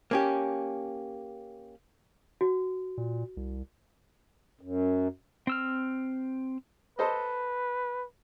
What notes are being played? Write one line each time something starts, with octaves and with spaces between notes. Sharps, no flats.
A#3 C#4 G4
F#4
A#2
C2
F#2
C4 E6 F6
A4 B4 C5 D#5